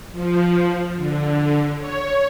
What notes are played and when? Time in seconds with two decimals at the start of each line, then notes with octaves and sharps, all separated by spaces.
0.12 F3
0.96 D3
1.78 C#5